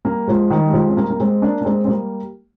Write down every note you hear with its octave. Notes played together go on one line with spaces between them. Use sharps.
G3 A#3
F3 G#3
D#3 G3
G3
F3 G#3
C4
G3 A#3
A#3
G#3 C4
A#3 D4
A#3
G#3 C4
C4
G3 A#3